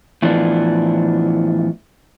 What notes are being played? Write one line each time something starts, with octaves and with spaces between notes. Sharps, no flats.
A2 E3 F3 B3 D4